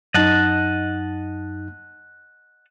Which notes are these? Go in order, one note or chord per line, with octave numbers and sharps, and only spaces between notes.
F#2 D#4 D#5 F#5 A5